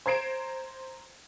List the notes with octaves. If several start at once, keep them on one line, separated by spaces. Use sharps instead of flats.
C5 A#5 G#6 C7 D7 E7